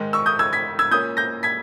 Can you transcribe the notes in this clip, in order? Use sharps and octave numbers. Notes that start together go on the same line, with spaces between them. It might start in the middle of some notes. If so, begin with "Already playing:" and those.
Already playing: G#2 D#3 G#3
C#6 E6
D#6 G6
E6 G#6
G#6 B6
E6 G#6
A#2 A#3 C#4 D#6 G6
G6 A#6
G#6 B6